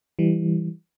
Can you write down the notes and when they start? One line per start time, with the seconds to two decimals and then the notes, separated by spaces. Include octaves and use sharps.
0.19 E3 G3